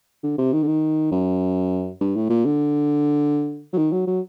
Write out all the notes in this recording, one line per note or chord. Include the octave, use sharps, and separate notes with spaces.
D3
C3
D#3
D3
D#3
F#2
G2
A2
A#2
D3
F#3
D#3
F#3
F#3